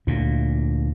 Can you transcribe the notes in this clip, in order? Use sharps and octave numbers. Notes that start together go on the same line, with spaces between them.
D2 A#2